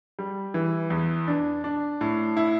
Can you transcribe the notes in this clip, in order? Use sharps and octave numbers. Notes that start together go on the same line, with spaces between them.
G3
E3
E2
D4
D4
A2
E4